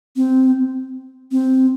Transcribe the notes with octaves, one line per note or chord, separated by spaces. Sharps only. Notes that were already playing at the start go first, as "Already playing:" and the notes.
C4
C4